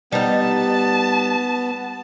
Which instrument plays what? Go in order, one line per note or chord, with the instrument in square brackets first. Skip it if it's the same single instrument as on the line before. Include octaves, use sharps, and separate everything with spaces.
[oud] G3 D#4 [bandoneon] B3 [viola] A5